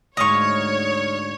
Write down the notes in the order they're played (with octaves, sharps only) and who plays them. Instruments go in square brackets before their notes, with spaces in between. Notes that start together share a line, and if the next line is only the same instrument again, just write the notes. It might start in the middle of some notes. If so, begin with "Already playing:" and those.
[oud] D2 G#2 [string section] C#5 [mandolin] D#5 F5 C#6